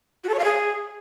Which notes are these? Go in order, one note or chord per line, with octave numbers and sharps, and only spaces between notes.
F#4
A4
C#5
F5
G#4